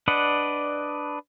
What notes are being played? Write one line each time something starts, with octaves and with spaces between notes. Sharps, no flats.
D4 B4 D5 D#5 F#5